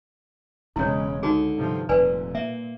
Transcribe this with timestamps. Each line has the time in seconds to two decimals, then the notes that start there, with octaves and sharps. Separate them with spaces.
0.76 E1 C#3 G#3 C#4 E4 C#5
1.23 C#2 D3 D#4 F#4 G#4
1.56 G2 C3 F3
1.89 F1 A#2 B4 D5 G#5
2.35 A#3 E5